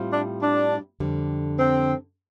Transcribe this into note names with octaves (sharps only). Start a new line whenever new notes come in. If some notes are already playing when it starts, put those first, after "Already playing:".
Already playing: A2 G3 C4 F4 C5
D4
D4
F2 D3 G3
C4